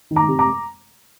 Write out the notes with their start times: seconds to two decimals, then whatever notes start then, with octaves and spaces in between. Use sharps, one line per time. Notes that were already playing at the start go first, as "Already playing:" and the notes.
0.11 D#3
0.16 A#5 D6
0.28 C3
0.39 A#5 D6